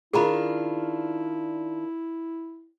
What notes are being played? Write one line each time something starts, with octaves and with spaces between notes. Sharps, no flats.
D#3 D4 E4 F4 G#4 A#5 B5